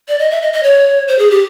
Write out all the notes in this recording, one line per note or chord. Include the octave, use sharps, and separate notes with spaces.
D5
D#5
E5
D#5
D#5
C#5
C5
G#4
G4